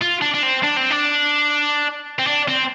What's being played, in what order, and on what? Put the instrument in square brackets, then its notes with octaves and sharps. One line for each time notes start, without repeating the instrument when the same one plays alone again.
[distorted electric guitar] F4
D4
D4
C4
D4
C4
D4
C4
D4
C4